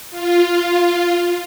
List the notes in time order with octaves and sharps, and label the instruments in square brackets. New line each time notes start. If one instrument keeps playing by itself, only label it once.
[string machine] F4